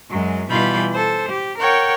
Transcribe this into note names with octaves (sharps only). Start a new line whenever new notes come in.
F#2 F#3 G#3
B2 E3 G3 F4 B5 G6
A4 C5
G4
A#4 C#5 F#5 G5 G6